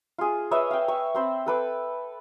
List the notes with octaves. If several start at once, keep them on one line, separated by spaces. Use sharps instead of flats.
F4 G#4
B4 C#5 D#5 E5
F5 G5
E5 C#6
C4 C5 B5
A4 B4 D6